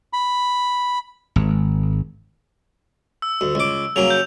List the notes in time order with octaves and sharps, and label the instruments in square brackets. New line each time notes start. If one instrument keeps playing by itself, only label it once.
[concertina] B5
[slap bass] G#1
[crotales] E6
[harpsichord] D2
C#2 D6
[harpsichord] C#3 F#3 A#3 [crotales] F7
[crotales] G6